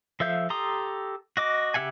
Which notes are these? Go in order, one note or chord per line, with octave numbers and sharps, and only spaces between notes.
F3 A4 E5 F5 G6
G4 A4 A#5 C6 D#6
F#4 D#5 D6
C#3 G4 E5 F#5 G#5